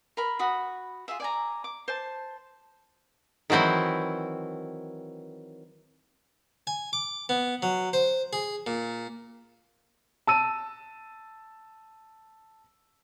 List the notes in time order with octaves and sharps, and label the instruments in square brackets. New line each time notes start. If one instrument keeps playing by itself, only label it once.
[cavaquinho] A#4 B5
F#4 B5 D#6
F4 G#4 E5
D5 G#5 A#5
D6
C5 A5
[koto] D#3 E3 F#3 C4 E4
[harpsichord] G#5
D6
B3
F#3
C5
G#4
A#2
[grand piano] A5 E6 D#7